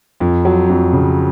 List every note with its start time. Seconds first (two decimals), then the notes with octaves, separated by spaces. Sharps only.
0.20 F2
0.45 F#3
0.70 F2
0.93 C#3